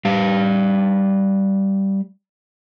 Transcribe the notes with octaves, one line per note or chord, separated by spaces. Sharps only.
G3 G4 F5